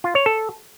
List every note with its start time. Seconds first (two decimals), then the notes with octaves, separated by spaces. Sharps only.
0.04 F4
0.15 C#5
0.26 A4